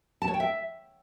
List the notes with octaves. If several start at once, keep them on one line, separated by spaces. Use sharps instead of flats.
A5
C#5
G5
E5